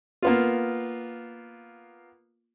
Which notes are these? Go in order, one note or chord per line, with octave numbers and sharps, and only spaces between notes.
A#3 B3 F4